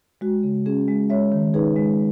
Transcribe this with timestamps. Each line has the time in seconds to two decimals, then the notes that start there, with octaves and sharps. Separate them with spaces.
0.21 G#3 F#4
0.43 C#3
0.66 C#4 G#4
0.88 G#3
1.10 G#3 C#5 E5
1.32 D#3
1.54 D#4 G#4 B4
1.76 G#3